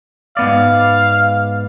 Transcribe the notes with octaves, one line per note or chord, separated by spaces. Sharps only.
G#2 B3 D5 F5